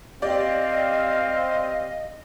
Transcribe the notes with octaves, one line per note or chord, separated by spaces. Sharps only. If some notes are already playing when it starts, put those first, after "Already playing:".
C4 G4 D5 D#5 F5